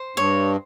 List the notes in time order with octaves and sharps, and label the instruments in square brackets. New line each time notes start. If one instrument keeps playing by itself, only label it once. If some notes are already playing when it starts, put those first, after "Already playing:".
Already playing: [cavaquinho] C5
[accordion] G2 [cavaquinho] C#5